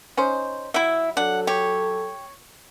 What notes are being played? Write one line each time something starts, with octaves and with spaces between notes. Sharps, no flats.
C#4 D#4 C5
F#3 E4 E5
F#3 D4 A4 F#5
G4 C#5